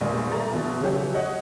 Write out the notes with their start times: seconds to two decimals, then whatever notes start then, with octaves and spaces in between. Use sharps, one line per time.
0.01 A#1 E2 G2 A#2
0.32 F3 A3 A#5 A6
0.53 A#1 B2 E3
0.81 C#3 F3 F#3 A3 C#4 G4
1.14 C#5 D#5 F#5